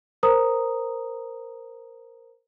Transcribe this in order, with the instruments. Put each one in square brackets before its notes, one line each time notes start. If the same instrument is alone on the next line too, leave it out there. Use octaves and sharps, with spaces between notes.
[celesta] A#4 C5 A#5 D#6